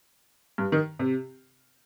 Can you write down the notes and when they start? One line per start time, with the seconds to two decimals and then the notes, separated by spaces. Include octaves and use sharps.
0.58 G2
0.72 D#3
0.99 C3